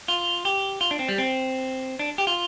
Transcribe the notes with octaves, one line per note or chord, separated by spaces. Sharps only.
F4
G4
F4
D4
C4
G3
C4
D4
G4
F4